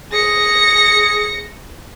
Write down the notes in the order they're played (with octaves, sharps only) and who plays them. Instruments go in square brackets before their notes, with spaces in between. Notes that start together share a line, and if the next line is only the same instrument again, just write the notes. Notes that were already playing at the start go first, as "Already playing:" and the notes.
[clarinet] G#4 [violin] A#6 C#7